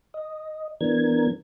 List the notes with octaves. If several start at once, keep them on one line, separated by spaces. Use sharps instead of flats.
D#5
E3 B3 D4 A#4 G#6